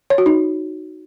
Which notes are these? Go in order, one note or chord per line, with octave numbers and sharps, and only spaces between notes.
C#5
F#4
D#4